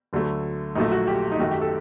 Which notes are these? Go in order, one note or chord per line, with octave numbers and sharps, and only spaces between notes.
D2 D3 F#3 A3
A#1 A#2 F#3 A3 D#4
F#4
G4
D#4
F#2 D#3 A3 F#4
G4
A4